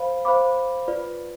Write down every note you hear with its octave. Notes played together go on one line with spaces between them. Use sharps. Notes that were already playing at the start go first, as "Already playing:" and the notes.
Already playing: C5 F5 B5
C5 F5 B5 D6
F4 B4 D5